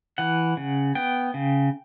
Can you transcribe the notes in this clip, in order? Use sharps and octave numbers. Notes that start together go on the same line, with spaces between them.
E3 F#5
C#3
B3 G5
C#3